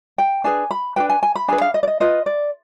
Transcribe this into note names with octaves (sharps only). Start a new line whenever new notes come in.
G5
D4 G#4 B4 G#5
B5
D4 G#4 B4 G5
G#5
G#5
B5
D4 G#4 B4 G#5
F5
D#5
D5
D#5
F4 B4 D#5
D5